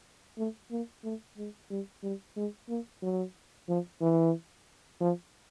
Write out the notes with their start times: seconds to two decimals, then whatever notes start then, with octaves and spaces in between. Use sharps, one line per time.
0.38 A3
0.71 A#3
1.04 A3
1.37 G#3
1.70 G3
2.03 G3
2.37 G#3
2.69 A#3
3.03 F#3
3.68 F3
4.01 E3
5.01 F3